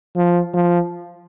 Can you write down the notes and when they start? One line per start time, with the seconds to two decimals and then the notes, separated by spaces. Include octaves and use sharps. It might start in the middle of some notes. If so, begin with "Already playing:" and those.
0.16 F3
0.54 F3